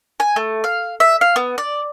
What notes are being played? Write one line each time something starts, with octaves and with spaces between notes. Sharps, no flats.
G#5
A3
F5
E5
F5
B3
D5